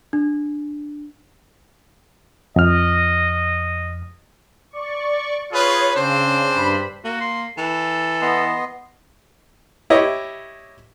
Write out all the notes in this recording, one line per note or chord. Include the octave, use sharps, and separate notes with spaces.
D4
F2 D#5 F6
D5 C#6
F4 G#4 B4 C#5 D#6
C#3 C4 D4 C5
G2 B5
A#3 F#4
C6
E3 A4
B3 D#5 C6
E4 G4 C#5 D#5